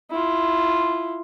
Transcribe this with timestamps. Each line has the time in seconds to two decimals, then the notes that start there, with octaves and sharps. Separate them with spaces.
0.10 E4 F4